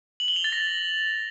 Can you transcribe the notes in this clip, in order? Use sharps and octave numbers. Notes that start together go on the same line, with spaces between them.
F#7
G7
F7
A6
A#6